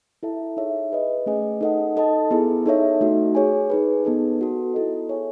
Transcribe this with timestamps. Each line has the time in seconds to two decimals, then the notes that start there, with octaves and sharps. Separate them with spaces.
0.23 E4 A4 E5 A5
0.57 D#4 G#4 C#5 E5
0.92 G#4 B4 D#5
1.26 A3 C#4 G#4 D#5 G#5
1.61 D#4 A4 D#5 F#5
1.96 D#4 A4 D#5 A5
2.31 B3 E4 G#4
2.66 D#4 A4 C#5 E5
3.01 A3 D#4 F#4
3.35 G#4 C#5 G#5
3.70 D#4 G#4 B4
4.05 B3 D#4 A4
4.39 B3 F#4 A4
4.74 E4 A4 D#5
5.09 G#4 C#5 E5 G#5